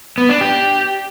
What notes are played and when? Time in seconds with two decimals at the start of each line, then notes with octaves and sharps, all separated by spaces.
0.18 B3
0.29 D4
0.41 G4